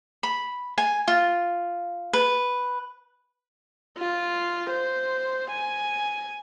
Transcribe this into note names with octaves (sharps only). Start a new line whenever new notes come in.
B5
G#5
F4
B4
F4
C5
G#5